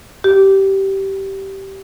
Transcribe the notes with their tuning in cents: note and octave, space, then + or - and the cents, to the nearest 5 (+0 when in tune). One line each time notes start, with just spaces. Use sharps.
G4 -15